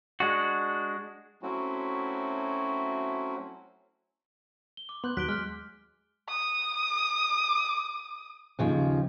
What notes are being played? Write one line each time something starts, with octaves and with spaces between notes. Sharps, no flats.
G#3 D4 F#4
F#3 A3 C4 C#4 E4 F#4
G7
D6
B3 C6 F#6 G6
D#2 F#3 F#6 B6 D7 G7
G#3 F6 F#6
D#6
D#2 C#3 F3